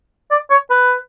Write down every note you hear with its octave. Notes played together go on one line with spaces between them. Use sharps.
D5
C#5
B4